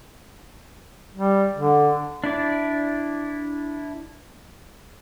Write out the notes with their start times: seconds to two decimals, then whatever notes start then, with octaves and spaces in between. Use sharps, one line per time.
1.14 G3
1.55 D3
2.24 D4 E4 D5